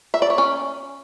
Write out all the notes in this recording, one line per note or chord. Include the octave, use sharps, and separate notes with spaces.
E5
D5
C#5
C#4